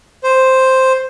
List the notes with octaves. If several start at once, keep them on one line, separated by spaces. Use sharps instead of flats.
C5